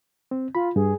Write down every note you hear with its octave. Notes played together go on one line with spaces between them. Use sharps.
C4
F4 B5
G2 G#4